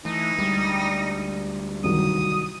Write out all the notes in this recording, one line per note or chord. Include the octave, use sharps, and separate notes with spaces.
E3 A3 D#4
D2 G3 G#3
C2 D#3 F#3 D#6